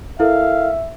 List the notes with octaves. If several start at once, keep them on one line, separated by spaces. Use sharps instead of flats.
E4 A4 A#4 E5 F5